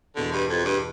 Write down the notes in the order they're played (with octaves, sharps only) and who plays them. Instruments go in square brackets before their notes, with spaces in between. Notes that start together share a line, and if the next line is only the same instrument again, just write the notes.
[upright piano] E2 B2 B3 [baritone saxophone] D3
[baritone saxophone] G2
F2
G2